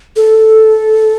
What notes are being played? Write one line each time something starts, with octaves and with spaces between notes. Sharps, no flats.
A4